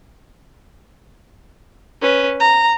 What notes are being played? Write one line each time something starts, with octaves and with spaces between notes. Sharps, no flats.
C#4 B4
A#5